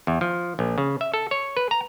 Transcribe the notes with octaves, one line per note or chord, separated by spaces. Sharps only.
E2
F3
A#1
C#3
E5
A4
C#5
B4
A#5